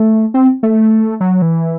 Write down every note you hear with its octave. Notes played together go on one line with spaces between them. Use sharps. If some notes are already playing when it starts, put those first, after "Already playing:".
Already playing: A3
C4
A3
F#3
E3